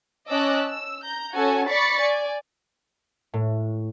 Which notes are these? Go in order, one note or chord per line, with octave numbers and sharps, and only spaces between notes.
C#4 D#5 A5 D6 E6 F#6
E6
A#5 G6
C#4 F#4 A4 F#5 G#5 A5
D5 B5 C#6 A6 B6 C#7
D5 G#5
A2